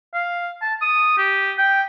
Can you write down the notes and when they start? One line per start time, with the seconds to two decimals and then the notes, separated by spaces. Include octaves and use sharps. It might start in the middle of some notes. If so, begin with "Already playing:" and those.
0.14 F5
0.62 A5
0.82 D#6
1.18 G4
1.58 G5